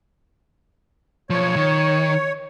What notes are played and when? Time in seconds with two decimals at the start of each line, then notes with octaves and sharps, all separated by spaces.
1.30 B1 F3 C#5
1.56 D#3